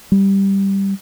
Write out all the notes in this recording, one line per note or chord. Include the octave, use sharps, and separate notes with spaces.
G3